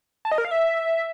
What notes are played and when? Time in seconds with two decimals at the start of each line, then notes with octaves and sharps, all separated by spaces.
0.25 A5
0.32 D#5
0.38 A#4
0.45 F5
0.51 E5